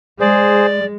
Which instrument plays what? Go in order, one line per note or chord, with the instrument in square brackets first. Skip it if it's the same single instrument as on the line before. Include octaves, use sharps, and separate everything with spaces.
[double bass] G#3 [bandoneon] G#4 C5 [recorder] D5